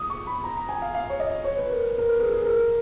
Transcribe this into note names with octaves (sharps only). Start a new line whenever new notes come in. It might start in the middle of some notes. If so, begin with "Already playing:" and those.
Already playing: D#6
C#6
B5
A#5
A#5
G#5
F5
F5
C#5
D#5
C#5
B4
A#4
A#4
B4
G#4
G#4
A#4